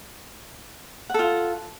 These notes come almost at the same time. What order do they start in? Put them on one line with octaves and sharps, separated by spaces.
F#5 A4 F4